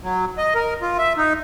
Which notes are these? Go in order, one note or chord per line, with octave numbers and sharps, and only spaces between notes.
F#3
D#5
A#4
F4
E5
D#4